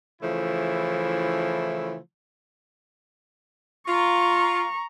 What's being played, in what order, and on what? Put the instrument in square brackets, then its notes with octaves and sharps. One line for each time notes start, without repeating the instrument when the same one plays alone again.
[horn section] C#3 E3 F3 A3 E4
[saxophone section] F4 [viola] A#5 C#6